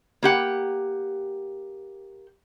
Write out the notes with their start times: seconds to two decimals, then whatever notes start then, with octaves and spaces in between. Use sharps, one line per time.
0.23 A#3 G4 F#5